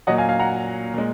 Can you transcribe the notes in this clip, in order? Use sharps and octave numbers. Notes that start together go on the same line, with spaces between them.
A#2 F#3 D#5 F#5
F5 G#5
F5 G#5
F#5 A#5
A#2 G#3